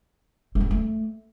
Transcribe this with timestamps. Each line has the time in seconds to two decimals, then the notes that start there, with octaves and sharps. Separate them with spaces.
0.55 A3
0.60 F3
0.66 A#3
0.71 A3